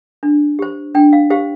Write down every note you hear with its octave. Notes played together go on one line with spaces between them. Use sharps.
D4
G4 C5
D4 G5
F5
G4 C5 F5